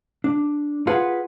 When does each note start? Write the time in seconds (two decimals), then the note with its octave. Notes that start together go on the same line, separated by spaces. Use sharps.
0.24 D4
0.87 F4 G#4 B4 F#5